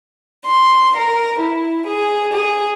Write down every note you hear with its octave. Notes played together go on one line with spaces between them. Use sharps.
C6
A#4
E4
G#4
G#4